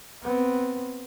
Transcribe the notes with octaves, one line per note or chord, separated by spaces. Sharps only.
B3 C4